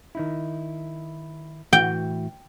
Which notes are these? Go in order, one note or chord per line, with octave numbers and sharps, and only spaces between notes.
D#3 D#4 E4
A2 E3 F#4 G5